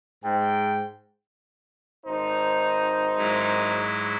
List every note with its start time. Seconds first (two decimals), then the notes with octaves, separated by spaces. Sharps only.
0.24 G#2 G5
2.05 G#1 D#4 C5
3.17 G#2 F#3 E4